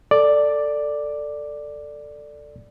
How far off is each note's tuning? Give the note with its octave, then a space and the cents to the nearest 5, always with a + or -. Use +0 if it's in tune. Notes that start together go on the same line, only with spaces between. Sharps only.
A4 +15 D5 +5